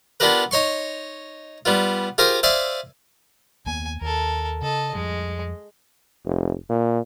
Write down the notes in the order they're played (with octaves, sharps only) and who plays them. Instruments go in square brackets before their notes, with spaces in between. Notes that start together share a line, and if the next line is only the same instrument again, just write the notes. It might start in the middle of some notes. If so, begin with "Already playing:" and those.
[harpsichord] B3 D4 F4 G4 A#4 B4
D#4 C#5 C6 C#6
G3 B3 F4
F4 G4 G#4 A#4 C5 F5
C5 D5 E5 F5 G#5
[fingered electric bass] D#2 A#3 B3 [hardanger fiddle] G#5
[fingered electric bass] D#2 [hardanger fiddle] A4 A#4
[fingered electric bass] C#3 [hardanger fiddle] A4 D#5
[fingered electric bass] F2 F3 G3 [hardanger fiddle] G#3
[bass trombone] F1
A#2